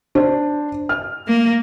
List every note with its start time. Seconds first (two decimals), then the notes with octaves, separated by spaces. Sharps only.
0.15 D4 C5
0.89 F6
1.27 A#3